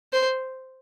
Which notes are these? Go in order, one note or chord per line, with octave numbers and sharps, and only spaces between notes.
C5